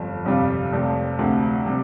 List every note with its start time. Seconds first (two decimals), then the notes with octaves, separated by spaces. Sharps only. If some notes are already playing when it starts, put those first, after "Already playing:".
Already playing: G1 F2 F3
0.25 G1 F2 C3 G3 F4
0.72 F1 F2 C3 F3
1.19 D2 C3 F3
1.66 C3 G3